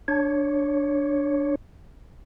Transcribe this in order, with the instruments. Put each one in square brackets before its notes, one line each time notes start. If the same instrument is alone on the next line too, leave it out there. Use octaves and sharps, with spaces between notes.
[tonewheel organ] D4 C#5